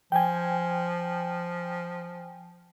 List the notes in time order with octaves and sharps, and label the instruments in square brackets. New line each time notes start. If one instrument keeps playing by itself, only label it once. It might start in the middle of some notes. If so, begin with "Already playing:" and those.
[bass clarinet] F3 [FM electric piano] G5 G#5